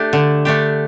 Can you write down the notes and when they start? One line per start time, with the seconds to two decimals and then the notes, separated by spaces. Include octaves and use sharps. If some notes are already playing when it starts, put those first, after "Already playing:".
Already playing: A3 D4 G4
0.13 D3
0.45 A3 D4 G4